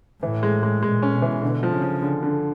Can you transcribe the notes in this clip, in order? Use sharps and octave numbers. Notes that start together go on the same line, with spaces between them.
A2 E3
G#3
G#3
A#2 G#3
C#4
B2
E3
B2 D3
F3
C#3
F3
D3
D3